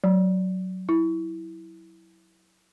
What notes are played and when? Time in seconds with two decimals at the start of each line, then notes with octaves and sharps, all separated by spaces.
0.04 F#3
0.89 E4